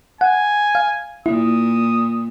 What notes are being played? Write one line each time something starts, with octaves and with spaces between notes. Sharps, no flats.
F#5 G#5
F5
A#2 E4 D#6